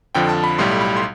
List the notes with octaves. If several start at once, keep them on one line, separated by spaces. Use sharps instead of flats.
F2 D3 F3 G5
A5
B5
B1 A2 G3 C6
B5
C6